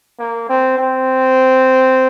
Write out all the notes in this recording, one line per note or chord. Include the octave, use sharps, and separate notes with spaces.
A#3
C4
C4